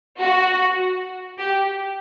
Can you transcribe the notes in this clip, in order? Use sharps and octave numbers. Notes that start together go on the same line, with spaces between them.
F#4
G4